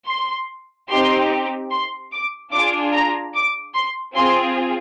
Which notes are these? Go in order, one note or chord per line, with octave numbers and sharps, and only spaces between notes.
C6
C4 D#4 G4 C6
C6
D6
D4 F4 G#4 D6
A#5
D6
C6
C4 F4 G#4 C6